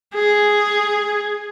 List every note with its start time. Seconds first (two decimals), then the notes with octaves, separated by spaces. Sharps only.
0.15 G#4